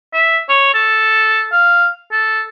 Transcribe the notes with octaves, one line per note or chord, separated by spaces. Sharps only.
E5
C#5
A4
F5
A4